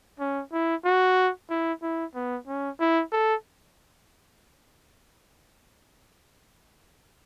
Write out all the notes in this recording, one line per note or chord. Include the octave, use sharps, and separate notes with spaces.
C#4
E4
F#4
E4
E4
B3
C#4
E4
A4